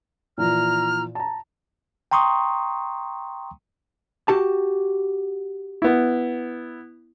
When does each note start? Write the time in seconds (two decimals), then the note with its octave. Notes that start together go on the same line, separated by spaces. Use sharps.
0.38 A#2 E3 F3 A#5 F6
1.15 A5 A#5
2.11 G5 A#5 C6 C#6 D#6
4.28 F#4 G4 A5
5.82 B3 E4